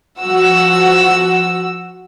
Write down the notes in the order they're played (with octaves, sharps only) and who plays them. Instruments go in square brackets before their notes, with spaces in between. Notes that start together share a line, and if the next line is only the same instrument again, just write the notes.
[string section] F3 F#4 E6